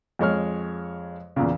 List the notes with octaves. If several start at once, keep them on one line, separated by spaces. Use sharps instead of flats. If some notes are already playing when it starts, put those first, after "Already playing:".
F2 G#3 C#5 F6
E2 A#2 C#3